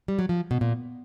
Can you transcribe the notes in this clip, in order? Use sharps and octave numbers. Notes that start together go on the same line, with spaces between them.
G3
F#3
F3
B2
A#2